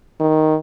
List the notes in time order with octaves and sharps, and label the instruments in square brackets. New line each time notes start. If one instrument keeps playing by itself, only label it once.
[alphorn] D#3